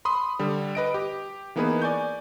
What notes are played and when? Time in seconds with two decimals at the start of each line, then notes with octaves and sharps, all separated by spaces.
0.05 B5 C6 D#6
0.39 D3 G3
0.75 B4 D#5 D7
0.94 G4
1.56 E3 A#3 B3 D#4 G#4 B4
1.82 D5 G#5 C#6 G6